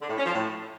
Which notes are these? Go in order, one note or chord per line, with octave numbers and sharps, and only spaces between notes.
D3
A2
C#4
F3
A2